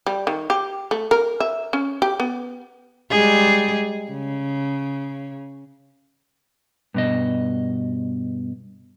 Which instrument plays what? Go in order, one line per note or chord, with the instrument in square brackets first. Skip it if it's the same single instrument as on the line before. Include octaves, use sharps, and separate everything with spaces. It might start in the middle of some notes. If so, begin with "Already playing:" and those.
[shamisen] G3
D#3
G4
A3
A#4
E5
C#4
G4
B3
[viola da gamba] G3 G#3 G#4
C#3
[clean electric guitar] G2 B2 D#5